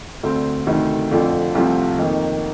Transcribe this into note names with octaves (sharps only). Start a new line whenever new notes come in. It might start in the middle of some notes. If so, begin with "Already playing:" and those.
D2 D3 A3 C4
D2 C3 D#3 A3
F2 D3 F3 A3
C2 C3 F3 A3 C4
F2 D#3 A#3 D#4